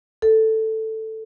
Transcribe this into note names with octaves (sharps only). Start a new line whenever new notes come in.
A4